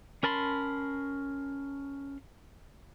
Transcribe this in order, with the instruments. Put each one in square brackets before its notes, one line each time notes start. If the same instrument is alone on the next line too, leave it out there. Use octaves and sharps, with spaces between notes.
[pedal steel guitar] C#4 A#4 A5 B5 C6